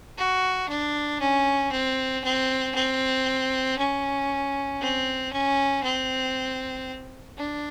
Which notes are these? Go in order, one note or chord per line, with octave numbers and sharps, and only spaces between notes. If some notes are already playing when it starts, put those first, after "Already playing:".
F#4
D4
C#4
C4
C4
C4
C#4
C4
C#4
C4
D4